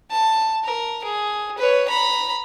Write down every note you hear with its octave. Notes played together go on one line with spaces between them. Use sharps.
A5
A#4
G#4
B4 C#5
A#5 B5